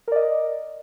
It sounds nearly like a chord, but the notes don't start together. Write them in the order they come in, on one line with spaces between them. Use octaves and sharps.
A#4 D5 D#5